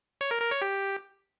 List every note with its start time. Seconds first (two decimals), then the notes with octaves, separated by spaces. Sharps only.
0.21 C#5
0.31 A#4
0.41 A#4
0.51 C#5
0.62 G4